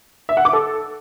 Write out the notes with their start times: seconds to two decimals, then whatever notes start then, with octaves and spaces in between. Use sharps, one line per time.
0.29 E5
0.37 F#5
0.45 D6
0.53 A4